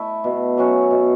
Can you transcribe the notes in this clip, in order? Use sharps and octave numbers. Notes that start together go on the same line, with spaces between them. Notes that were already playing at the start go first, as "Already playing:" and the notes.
Already playing: A3 E4
B2
F#3 C#4 F#4
B2